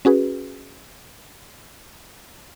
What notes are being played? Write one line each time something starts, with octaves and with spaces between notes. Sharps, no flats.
C#4 F#4 G#4 B4